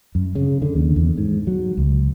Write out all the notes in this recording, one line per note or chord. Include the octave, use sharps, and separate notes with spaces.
F#2
C#3
D3
D#2
E2
G#2
F#3
C#2